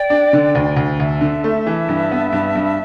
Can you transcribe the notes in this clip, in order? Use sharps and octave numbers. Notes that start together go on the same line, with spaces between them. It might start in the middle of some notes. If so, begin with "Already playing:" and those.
Already playing: D5 G5
D4
D3
D2
D2
D2 E5 A5
D3
A3
E3
G2
B3
G2
G2